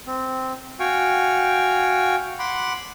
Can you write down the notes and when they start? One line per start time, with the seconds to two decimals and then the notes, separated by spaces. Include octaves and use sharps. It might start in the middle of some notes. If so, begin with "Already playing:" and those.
0.07 C4
0.80 F#4 F5 G5 G#5 C#6
2.39 F#5 B5 C6 D6